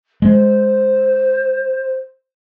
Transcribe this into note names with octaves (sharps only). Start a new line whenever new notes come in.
G#3 C5